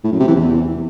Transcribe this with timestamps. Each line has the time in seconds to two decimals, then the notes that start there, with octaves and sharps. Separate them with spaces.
0.04 A2
0.12 F#2
0.20 C3
0.28 E3
0.35 E2